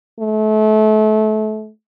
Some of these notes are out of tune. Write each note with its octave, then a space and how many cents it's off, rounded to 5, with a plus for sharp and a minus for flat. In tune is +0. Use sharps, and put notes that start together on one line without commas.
A3 -30